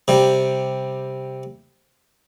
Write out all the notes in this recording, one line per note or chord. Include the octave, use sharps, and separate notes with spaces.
C3 G3